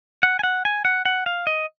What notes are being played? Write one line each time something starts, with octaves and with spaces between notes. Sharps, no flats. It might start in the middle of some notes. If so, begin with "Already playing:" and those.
F#5
G#5
F#5
G#5
F#5
F#5
F5
D#5